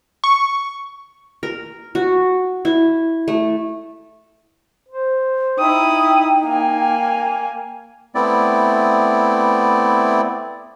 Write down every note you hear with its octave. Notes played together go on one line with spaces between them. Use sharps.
C#6
A#4
F#4
E4
A3
C5
D#4 E4 G5 D#6
A#3 G#5
A3 B3 C4 E4 D5